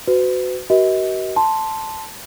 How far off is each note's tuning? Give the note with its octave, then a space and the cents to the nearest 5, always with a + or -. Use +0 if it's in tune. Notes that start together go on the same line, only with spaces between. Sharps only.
F#4 +0 B4 +40
F#4 +40 A#4 +45 D#5 +35
A5 +0 C6 +0